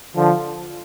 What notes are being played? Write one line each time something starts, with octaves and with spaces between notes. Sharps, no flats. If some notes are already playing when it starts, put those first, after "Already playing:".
D3 F3